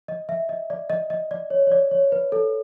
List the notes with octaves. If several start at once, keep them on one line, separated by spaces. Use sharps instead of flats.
D#5
E5
D#5
D5
D#5
D#5
D5
C#5
C#5
D5
C#5
B4
A4